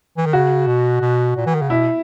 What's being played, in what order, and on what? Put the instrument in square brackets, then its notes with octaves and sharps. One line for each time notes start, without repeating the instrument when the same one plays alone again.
[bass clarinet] E3
D#3
[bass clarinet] C#3 [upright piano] F#4
[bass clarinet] B2
B2
A#2
E3
D#3
C#3
[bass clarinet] B2 [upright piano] E4